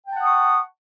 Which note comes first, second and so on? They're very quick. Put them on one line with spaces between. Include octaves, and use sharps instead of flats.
G5 A5 F#5 D#6 C#6